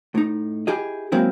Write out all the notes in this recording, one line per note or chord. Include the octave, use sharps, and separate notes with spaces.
A2 D#4
E4 G4 G#4 D#5
F#3 G#3 A#3 C4 E4